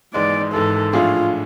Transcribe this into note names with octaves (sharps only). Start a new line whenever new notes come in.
G#1 G#2 E3 G#3 D5
G#1 G#2 E3 G#3 A4
A2 F3 A3 D4 F4 G#4